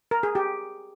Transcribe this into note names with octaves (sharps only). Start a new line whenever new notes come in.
A#4
G#4
G4